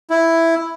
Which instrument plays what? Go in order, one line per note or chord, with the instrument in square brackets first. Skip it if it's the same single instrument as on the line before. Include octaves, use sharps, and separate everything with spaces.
[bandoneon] E4